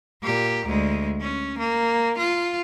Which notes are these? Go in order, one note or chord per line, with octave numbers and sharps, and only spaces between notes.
A#2 G4
D2 G#3
C#4
A#3
F4